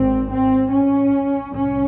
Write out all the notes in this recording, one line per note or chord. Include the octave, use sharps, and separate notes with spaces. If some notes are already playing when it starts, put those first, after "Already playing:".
Already playing: G#1 G#2 C4
C4
C#4
C2 C#4